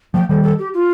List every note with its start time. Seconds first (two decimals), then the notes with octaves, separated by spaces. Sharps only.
0.14 F3 A3 G5
0.29 D#3 G3 A4
0.43 A4
0.59 G4
0.74 F4